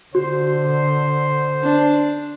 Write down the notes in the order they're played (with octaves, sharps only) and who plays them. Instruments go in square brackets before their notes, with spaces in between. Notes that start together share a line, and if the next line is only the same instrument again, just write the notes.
[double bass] D3 [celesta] F#4 [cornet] C5
[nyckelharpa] D4